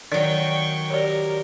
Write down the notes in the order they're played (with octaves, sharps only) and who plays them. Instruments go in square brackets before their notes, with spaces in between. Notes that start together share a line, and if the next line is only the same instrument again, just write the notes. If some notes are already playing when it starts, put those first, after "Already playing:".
[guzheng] D#3 F#3 [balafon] D5 [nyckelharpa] G5 C#6
[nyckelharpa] G4 A#4 [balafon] C#5 D5